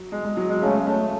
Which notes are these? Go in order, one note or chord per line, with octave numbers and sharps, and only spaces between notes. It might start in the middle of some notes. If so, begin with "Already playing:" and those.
Already playing: F#3
G#3
G#3
F#3
G#3
C#3 A3
A3